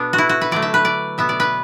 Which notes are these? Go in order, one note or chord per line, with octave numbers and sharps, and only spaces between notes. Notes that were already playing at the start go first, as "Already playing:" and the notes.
Already playing: B2 B3 D4 A4
F#4
E4
F#4
B4
D3 F#3 A3 D5
E5
B4
D5
B2 B3 E5
D5
B4